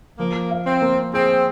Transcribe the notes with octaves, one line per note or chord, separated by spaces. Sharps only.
F3 A#3
F5
C4
A#3
C4 G#4